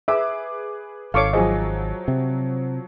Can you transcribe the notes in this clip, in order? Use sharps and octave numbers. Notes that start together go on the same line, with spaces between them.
G#4 B4 E5 D6
G#1 A4 C#5 F5 C#6 D6
F3 F#3 G#4 D#5
C3